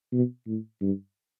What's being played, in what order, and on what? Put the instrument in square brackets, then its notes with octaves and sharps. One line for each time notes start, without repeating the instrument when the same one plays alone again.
[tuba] B2
A2
G2